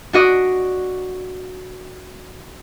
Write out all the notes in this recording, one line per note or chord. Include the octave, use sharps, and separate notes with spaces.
D4 F#4 D#5 D6